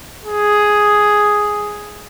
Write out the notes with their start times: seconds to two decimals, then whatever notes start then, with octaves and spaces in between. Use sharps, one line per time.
0.25 G#4